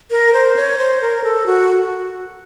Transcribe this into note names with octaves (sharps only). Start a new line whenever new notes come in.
A#4
C5
C#5
C5
A#4
A4
F#4